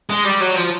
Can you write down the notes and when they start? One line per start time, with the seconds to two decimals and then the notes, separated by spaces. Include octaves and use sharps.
0.10 G#3
0.25 G3
0.41 F#3
0.56 F3